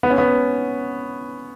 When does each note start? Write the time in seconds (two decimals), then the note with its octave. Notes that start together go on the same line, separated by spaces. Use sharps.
0.03 B3
0.10 C#4
0.18 B3